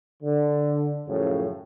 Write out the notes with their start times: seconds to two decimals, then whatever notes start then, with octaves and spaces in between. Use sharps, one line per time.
0.22 D3
1.06 F#2 A2 C#3 F3